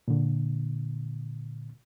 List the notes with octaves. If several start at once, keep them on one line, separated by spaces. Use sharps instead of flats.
A#2 D3